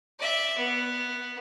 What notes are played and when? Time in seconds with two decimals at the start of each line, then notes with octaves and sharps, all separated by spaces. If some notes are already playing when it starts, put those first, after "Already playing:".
0.19 D5 E5
0.58 B3